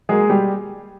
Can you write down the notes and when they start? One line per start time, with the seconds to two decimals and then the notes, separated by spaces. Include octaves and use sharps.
0.09 F#3 G#3 A#3 G#4
0.30 B2 G3 G4